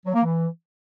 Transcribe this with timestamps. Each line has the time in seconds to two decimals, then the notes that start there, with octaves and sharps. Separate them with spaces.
0.05 F#3
0.14 A#3
0.23 E3